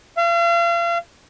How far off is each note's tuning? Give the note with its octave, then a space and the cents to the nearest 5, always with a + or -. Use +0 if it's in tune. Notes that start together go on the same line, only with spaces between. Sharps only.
F5 -40